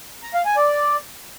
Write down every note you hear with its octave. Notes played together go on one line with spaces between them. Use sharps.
A#5
F5
G#5
D5